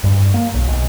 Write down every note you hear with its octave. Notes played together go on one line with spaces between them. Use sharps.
G2
A#3
B1
B1